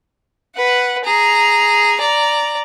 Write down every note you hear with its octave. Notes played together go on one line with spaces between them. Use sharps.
B4 F#5
G#4 A#5
D5 A#5